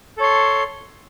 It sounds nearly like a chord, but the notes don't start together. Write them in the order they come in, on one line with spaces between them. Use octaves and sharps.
A4 C#5 C6